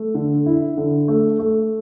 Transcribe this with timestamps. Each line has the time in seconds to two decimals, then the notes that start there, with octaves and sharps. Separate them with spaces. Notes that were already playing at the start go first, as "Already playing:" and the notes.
Already playing: A3
0.14 D3
0.46 E4
0.77 D3
1.08 A3
1.39 A3